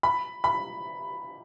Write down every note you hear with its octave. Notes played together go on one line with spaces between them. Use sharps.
B5
B5